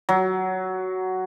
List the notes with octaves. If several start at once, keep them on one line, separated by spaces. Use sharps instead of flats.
F#3